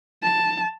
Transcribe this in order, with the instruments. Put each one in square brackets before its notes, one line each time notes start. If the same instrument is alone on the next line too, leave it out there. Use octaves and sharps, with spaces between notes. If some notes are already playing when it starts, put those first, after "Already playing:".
[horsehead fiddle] A5